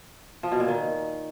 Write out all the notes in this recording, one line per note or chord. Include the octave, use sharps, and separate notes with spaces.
F3
B2
A#2
D#3